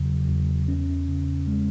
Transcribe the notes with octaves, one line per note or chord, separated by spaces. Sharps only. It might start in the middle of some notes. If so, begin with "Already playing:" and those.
Already playing: E2 C#3 F#3
E2
C#4
C#3
G#3